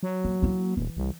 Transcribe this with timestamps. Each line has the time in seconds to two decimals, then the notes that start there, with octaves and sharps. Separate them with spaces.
0.03 F#3
0.24 A#3
0.42 A#3 E4
0.77 D#1 E3
0.97 C2